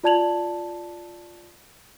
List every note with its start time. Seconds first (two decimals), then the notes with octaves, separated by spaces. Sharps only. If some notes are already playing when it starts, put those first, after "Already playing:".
0.04 F4 D5 A5 G#6 F7 F#7